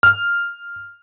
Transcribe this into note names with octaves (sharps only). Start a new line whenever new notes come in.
F6